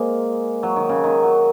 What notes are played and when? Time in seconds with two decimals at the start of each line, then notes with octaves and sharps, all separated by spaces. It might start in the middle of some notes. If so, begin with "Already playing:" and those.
Already playing: G#3 A#3 C4
0.63 F#3
0.76 D#3
0.89 C#3
1.04 D#3
1.23 F#3